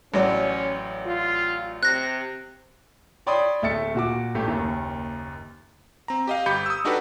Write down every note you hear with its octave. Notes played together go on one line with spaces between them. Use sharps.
A1 F#3 C#4 D5
F4
C3 F#6 A#6
C#5 D5 G5 B5 C6 D#6
D1 A3 E5 A6 C#7
A#2 F#4 D6
A1 A3 G4
F#1 D#2 D#3
C4 A#5
G4 D#5 F5
G1 G4 B5 G6 C#7
D#6 E6
D4 D#4 F#4 G4 A4 B4